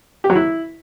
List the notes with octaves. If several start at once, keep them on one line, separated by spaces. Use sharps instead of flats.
G4
F#3
E4